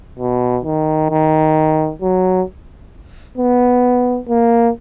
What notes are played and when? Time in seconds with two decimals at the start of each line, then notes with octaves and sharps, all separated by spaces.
0.19 B2
0.65 D#3
1.11 D#3
2.02 F#3
3.37 B3
4.29 A#3